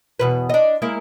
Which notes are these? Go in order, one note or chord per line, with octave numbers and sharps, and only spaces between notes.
E2 B2 B4
D4 D#5
G#3 A#3 E4